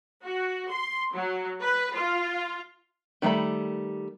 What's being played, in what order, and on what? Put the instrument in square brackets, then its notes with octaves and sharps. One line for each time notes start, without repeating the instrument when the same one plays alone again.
[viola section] F#4
C6
F#3
B4
F4
[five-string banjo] D#3 G3 A3 A#5 B5